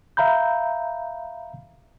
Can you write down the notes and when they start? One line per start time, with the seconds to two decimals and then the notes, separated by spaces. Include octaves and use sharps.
0.17 E5 F5 A#5 B5 G6